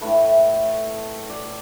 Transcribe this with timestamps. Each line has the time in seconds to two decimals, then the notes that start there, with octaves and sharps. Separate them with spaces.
0.01 A2 A3 B4
1.30 D5